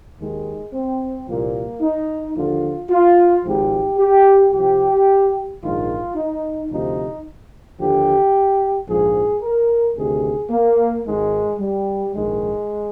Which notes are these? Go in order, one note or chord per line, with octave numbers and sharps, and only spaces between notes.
D#2 D#3 G#3
C4
C2 A#2 F3 A#3
D#4
D#2 D3 F3 F4
F4
G#1 G#2 F3 G4
G4
C2 C3 F3 G4
A#1 G#2 D#3 F4
D#4
D2 C3 F3 D#4
D#2 D3 F3 G4
A#1 G#2 F3 G#4
A#4
D2 C3 D#3 G#4
A#3
G#1 G#2 D#3 G#3
G3
A#1 G#2 D#3 G#3